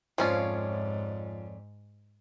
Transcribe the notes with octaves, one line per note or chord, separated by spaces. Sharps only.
F2 G#2 F3 C#4 F4 C#5 D5